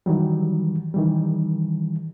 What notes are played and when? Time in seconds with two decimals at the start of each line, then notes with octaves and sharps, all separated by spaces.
0.06 D#3 E3 F#3 G3
0.94 D#3 E3 G3